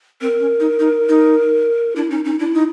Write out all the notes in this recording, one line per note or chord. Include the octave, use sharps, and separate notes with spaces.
C4 A#4
C#4
D#4
D#4
D#4
D4 E4
C#4 D#4
C#4 D#4
D4 E4
D#4